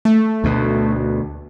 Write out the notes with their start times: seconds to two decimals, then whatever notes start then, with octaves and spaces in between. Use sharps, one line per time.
0.05 A3
0.44 D2 B2